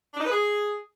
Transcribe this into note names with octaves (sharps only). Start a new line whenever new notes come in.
D4
D#4
B4
G#4